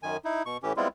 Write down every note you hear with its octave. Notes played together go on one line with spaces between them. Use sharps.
F#2 D#3 G#5
D#4 E4
B2 C#6
A2 E3 C#4 G4
G3 G#3 B3 C4 E4 F4